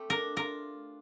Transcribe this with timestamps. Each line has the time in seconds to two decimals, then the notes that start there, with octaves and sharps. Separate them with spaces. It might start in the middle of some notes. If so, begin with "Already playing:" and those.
Already playing: A3 C4 G4
0.10 D4 A#4
0.36 F4 A#4